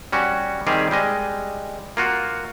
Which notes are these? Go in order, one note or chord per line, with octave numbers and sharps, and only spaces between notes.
G3 C#4 F#4
D#3 G3 C4 G4 G#4
G3 G#3 D#5
A#3 F4 F#4